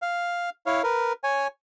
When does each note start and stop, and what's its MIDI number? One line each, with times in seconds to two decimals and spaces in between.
0.02 0.50 77
0.66 0.82 64
0.66 0.82 73
0.66 0.82 77
0.84 1.13 70
0.84 1.13 71
1.24 1.47 73
1.24 1.47 80